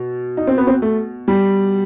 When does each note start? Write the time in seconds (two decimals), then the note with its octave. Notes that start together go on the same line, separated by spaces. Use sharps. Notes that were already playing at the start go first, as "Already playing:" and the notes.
Already playing: B2
0.37 D#4
0.47 C4
0.58 B3
0.67 C4
0.82 A3
1.28 G3